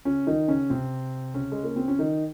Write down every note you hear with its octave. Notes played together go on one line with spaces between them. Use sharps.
C#3 C#4
D#3 D#4
C#3 C#4
C3 C4
C#3 C#4
G#3
A#3
C4
C#4
D#3 D#4